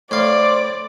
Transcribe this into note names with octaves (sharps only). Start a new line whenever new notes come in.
A2 C5 D5 F5